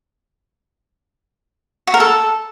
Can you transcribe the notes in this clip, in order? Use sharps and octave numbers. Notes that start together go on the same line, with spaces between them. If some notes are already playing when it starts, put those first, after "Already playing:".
F#4
A#4
A4